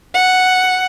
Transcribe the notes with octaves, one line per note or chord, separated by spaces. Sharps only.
F#5